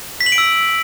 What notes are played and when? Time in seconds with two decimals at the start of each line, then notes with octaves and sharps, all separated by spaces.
0.21 B6
0.26 F#7
0.32 D7
0.38 E6